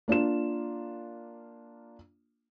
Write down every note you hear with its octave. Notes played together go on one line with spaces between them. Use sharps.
A#3 D4 F4 E7